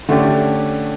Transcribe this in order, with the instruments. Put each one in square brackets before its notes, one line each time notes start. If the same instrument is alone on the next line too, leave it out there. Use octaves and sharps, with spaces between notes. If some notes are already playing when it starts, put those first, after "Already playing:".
[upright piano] D3 A3 C#4 G4 D5